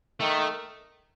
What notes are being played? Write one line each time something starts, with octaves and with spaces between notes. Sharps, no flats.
D#3 A3